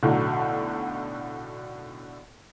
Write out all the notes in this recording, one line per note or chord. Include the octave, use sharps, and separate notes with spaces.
B1 A2 D3 F#3